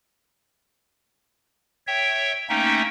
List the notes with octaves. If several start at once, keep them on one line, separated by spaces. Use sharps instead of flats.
C#5 E5 G5
A3 A#3 C#4 D#4 E5 G5